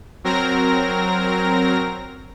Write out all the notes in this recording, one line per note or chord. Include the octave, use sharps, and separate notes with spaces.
F#3 C4 A#4 A#6